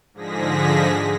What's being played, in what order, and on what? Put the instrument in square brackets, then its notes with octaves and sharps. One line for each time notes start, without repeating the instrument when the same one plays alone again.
[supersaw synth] G#2 D3 F3 G#4 A#6 B6